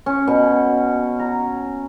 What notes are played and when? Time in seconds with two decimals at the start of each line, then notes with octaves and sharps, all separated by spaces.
0.06 C#4
0.28 B2
1.19 A#5